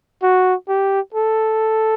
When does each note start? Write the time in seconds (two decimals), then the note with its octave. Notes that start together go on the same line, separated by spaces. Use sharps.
0.22 F#4
0.68 G4
1.15 A4